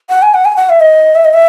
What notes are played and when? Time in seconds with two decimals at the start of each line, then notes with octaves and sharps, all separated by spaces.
0.09 F#5
0.22 G#5
0.34 F#5
0.45 G#5
0.57 F#5
0.70 E5
0.80 D#5
1.16 E5
1.25 D#5
1.34 E5